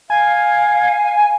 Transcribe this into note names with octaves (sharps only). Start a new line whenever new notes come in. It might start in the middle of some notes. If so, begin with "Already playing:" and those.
F5 G#5